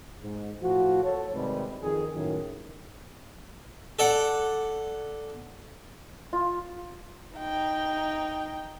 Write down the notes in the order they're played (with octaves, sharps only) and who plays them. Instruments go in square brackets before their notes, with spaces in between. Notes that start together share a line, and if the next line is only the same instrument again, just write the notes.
[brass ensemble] G#2
A2 F3 F#4
A4 C#5
G#1 C3 G3 G#3 B4
F2 D#3 G#4
F#2 A2 D#3
[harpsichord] A4 D5 F#5
[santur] F4
[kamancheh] D#4 G5